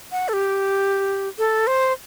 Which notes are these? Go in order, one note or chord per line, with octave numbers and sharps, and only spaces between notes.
F#5
A4
G4
A4
C5